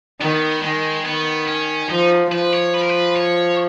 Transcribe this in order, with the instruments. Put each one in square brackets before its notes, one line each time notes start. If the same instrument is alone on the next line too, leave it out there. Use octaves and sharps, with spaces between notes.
[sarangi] D#3 [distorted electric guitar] B3
[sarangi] D#3 [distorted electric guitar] G#3
[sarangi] D#3 [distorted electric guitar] B3
[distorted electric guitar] C#4
[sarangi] F3 [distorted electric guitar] D#4
[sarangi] F3 [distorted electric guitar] B4
[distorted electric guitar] C#5
B4
A#4
B4
C#5